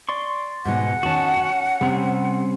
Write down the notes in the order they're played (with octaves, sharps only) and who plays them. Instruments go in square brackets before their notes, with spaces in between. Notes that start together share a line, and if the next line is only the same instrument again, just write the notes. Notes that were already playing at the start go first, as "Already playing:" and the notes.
[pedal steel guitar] D5 C6 C#6
[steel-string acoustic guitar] G#2 B2 G#3 [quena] F#5
[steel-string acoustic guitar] D#3 C#4 [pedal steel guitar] F#4 A5
[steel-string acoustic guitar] C#4
[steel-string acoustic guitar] C3 [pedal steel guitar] G3 C4 C#4